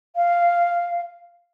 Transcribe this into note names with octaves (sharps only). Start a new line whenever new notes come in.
F5